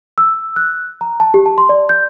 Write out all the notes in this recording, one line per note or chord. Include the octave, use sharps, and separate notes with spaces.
E6
F#6
A#5
A5
G4
A5
C6
D5
G6